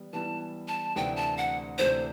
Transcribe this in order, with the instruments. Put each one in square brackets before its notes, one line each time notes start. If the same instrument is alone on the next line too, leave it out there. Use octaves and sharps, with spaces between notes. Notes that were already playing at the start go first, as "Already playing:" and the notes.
Already playing: [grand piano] E3 G3 B3
[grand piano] E3 G3 B3 E4 [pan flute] A5
[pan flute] A5
[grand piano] D2 C3 E3 A3 D4 [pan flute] G5
[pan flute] A5
F#5
[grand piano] D2 C3 E3 A3 D4 [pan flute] C5